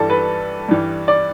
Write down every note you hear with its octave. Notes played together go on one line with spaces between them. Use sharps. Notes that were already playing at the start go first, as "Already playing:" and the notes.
Already playing: G2 E3 G3 A4
B4
G2 E3 G3
D5